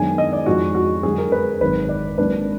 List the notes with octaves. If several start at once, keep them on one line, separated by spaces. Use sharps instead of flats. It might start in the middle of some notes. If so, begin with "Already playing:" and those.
Already playing: F#2 D#3 G#3 B3 D4 G#5
D#5
D5
F2 F3 G#3 D#4 F#4
F#4
F#2 D3 G#3 G#4
A#4
B4
G#1 F#2 D#3 B4
D5
G#1 G#2 F#3 A#3 D4 B4